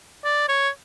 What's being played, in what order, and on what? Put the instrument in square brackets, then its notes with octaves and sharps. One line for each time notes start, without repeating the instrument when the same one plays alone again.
[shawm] D5
C#5